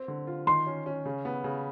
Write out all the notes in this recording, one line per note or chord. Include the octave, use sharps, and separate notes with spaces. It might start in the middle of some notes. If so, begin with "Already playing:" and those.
Already playing: C4
D3
F4
D#3 C6
C#4
C#4
C#3
B3
C#3